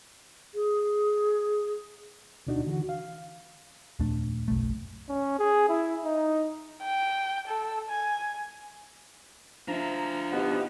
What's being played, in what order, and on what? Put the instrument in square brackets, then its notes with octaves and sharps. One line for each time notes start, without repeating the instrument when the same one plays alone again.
[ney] G#4
[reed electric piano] D2 B2 D4 D#4 F#4
D3 E3 F#4
F5
[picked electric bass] D#1 F2 A3 D4
F#1 B1 A3
[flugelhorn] C#4
G#4
E4
D#4
[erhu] G5
A4
G#5
[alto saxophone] F3 [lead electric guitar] D4 E5 [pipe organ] A#5
[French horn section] B2 D#4 G4 [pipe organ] B3